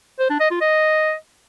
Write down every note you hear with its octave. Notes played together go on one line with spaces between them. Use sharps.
C5
D4
D#5
F4
D#5